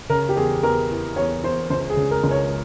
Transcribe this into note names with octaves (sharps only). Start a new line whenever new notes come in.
C#3 A#4
G4
E2 G#4
E2 A#4
E3
E2 C#5
E2 C5
C#2 C5
G#4
C#3
A#4
C#2
C#5